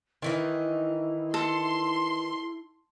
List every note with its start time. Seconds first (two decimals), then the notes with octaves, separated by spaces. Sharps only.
0.22 D#3 E3 D#4 E4
1.34 A4 C6